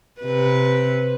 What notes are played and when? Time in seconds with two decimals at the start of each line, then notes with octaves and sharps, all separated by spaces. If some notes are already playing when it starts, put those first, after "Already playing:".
0.21 C3 B4